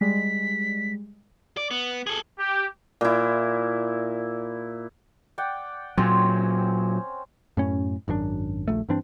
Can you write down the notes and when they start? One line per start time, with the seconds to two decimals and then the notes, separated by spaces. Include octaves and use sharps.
0.01 G3 G#3 B6
1.57 D5
1.71 B3
2.07 G#4 A4
2.39 G4
3.01 A#2 E4
5.38 D5 F#5 G5
5.98 A#2 F#3 C4 C#4 C5
7.57 F#2 A2 C#4
8.08 G#1 F#2 E3 D4
8.68 D#1 A#1 A3
8.89 G2 E3 C4 D4